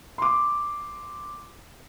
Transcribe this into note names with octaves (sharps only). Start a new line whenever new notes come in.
C6 D6